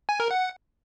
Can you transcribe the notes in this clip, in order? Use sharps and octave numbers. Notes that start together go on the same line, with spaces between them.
G#5
A#4
F#5